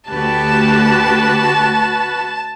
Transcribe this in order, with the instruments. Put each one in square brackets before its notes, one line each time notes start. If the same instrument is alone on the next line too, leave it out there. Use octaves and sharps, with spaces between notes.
[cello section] D2 G4 [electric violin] F#4 B4 [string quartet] A5